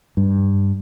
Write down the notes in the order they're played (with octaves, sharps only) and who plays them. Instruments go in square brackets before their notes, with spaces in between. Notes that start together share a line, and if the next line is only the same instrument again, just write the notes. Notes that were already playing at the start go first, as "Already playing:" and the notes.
[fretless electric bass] G2